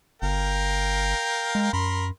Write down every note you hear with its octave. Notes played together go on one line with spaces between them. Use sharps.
G1 A#4 F5 G5
G#3
F#2 A#4 B5 C6